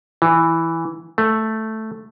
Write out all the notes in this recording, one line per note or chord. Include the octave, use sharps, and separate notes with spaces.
E3
A3